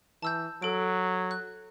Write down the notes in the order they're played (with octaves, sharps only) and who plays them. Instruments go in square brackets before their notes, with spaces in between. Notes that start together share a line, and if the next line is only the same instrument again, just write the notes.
[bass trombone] E3 [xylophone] A5 E6 G6
[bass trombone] F#3 [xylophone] A4 D7
[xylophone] F#6